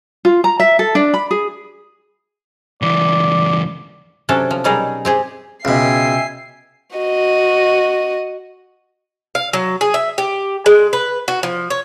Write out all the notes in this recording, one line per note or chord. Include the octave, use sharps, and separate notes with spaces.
F4
A#5
E5
A4
D4
B5
G#4
C#2 E3 D5
C3 F#3 C#4 D4 A4
F3
B2 F#3 G3 D#4 G#4 A#4
C4 G4 G#4
C#2 B2 E5 G5 G#5 C7
F#4 D#5
F5
F#3
G#4
E5
G4
G#3
B4
F#4
F3
C#5